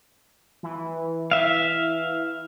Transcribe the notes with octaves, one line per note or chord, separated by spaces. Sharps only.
E3
E5 F5